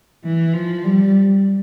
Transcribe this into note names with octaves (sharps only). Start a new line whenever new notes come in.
E3
F3
G3